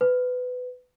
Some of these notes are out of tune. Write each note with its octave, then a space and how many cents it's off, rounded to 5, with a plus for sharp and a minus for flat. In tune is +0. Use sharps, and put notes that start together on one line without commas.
B4 +20